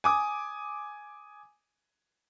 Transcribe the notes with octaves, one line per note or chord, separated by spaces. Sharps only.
G#5 D6 D#6